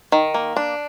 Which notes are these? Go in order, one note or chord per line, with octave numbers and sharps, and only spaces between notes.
D#3
A#3
D4